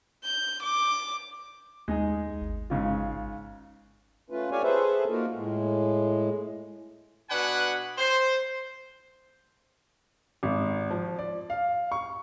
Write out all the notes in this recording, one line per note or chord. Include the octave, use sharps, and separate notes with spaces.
G6
D6
D#2 G#3 D#4 G#4
G#1
G#2 C#3 F4
A3 C#4 F4 B4
G4 C#5 D5 F5 G#5
G#4 A4 B4 C5 E5
A#3 D#4 F4 F#4 A#4
A2 G#3
B2 D4 B4 F#5 G#5 B5
C5
G#1
F3
D5
F5
C#6